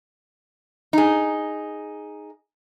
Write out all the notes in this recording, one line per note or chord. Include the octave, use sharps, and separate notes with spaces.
D#4 G#4